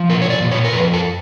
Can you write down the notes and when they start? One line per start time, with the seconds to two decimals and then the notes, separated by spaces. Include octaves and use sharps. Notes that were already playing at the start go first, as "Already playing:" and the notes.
Already playing: F3
0.09 A#2 A#4
0.22 C#5
0.30 D5
0.41 A#2
0.51 C#5
0.64 A#4
0.73 F2 B4
0.93 A4